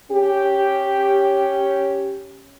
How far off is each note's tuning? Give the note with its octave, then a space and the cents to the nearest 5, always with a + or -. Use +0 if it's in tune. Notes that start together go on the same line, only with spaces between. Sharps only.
C#4 +0 G4 +0